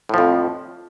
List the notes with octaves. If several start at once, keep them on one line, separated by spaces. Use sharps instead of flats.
F2 A2 F3